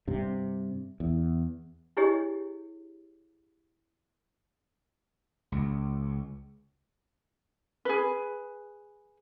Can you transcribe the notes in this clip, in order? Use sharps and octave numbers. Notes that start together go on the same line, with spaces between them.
G2 C3
E2
D4 E4 G4 G#4 C#5 D#5
C#2
G#4 B4